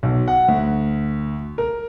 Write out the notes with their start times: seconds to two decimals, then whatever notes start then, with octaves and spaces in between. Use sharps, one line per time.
0.03 B1
0.28 F#5
0.48 D2
1.58 A#4